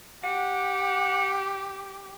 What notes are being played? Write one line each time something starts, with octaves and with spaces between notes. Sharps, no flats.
G4 F#5